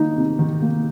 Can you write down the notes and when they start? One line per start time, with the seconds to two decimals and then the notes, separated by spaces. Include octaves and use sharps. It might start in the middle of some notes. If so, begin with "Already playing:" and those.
Already playing: D#3 A#3 D#4
0.17 C3
0.39 D#3
0.62 A#3